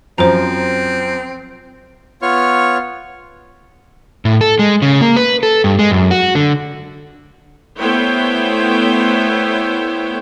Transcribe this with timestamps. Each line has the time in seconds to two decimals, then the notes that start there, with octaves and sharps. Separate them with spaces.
0.18 F#2 F3 C4 C5 A#5
2.22 B3 F4 C#5 C#6 F6
4.25 A2
4.41 A4
4.59 G#3
4.82 C#3
5.01 A#3
5.17 B4
5.43 A4
5.64 G2
5.79 G#3
5.91 F#2
6.11 F#4
6.35 D3
7.78 A3 B3 E4 C5 C#5 G5